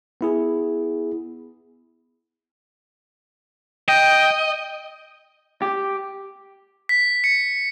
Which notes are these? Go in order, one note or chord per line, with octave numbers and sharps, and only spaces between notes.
B3 E4 G#4
D#5 G5
G4
B6
C#7